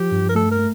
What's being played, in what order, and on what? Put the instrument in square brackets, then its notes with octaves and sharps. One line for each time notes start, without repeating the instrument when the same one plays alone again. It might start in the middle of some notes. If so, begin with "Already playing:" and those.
Already playing: [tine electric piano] F3 [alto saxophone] G4
[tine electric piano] G2
[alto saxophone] A#4
[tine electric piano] A3 [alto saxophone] A4
[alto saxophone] A#4
[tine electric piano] A3